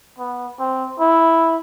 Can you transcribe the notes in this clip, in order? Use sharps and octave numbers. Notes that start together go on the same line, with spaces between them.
B3
C4
E4